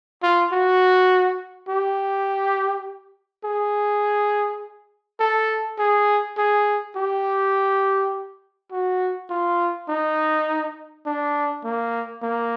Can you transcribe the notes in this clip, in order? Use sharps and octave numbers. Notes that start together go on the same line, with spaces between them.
F4
F#4
G4
G#4
A4
G#4
G#4
G4
F#4
F4
D#4
D4
A#3
A#3